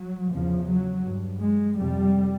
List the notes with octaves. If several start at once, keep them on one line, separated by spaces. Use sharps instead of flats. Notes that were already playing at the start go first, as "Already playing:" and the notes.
Already playing: F#3
E2 C#3 F3
F#3
G2
G#3
F2 C3 G3